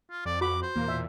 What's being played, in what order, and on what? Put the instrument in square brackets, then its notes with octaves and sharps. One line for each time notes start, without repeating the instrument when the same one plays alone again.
[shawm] F4
[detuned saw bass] F2 [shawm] D5
[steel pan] F#4 B5 [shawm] D6
[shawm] C5
[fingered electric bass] E2 B2 [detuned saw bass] A#3
[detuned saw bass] A#2 [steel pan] E5